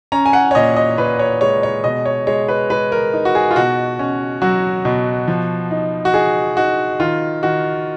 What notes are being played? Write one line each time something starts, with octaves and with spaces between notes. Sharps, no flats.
C#4 A#5
G#5
F#5
C#5
A#2 D#5
D#5
A#2 B4
C#5
G#3 C#5
C#5
B2 D#5
C#5
G#3 C#5
B4
G#3 B4
A#4
D#4
F#4
G#4
F4
B2 F#4
C#4
F#3 F#4
B2
F3
D#4
F#4
D#4 G#4
D#4 F#4
D#3 F4
D#3 F#4